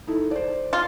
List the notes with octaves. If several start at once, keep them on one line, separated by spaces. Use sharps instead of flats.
D#4 E4 A4
C5 D5
F4